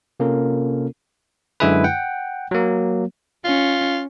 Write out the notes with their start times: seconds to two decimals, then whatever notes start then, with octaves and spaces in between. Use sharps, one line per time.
0.20 C3 A#3 C#4 F4 A4 A#4
1.60 F#2 D3 G#3 E4 G#4 B4
1.84 F#5 G5
2.51 F#3 A#3
3.45 C#4 F4